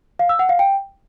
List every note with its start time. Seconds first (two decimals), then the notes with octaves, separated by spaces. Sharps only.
0.19 F5
0.29 E6
0.39 F#5
0.49 F5
0.59 G5